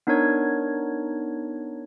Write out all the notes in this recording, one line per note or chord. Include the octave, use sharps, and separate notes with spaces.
B3 D4 D#4 A#4 C#5 G#6